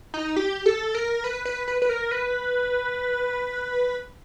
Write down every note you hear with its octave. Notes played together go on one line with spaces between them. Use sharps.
D#4
G4
A4
A#4
B4
B4
B4
B4
A#4
B4